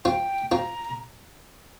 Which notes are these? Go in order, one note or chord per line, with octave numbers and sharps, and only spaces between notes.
C4 F4 G5
C4 F4 A#5